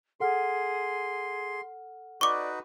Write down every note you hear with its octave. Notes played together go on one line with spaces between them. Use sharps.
G#4 A4 F#5 C6 F6
D#4 F#4 B4 D5 C#6 D6